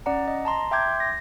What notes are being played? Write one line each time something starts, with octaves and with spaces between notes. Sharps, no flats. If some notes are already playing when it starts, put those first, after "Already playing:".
C#4 D5 F#5 A#5
D#5
A5 A#5 C6
E5 G5 C6 D6 G6 G#6
A#6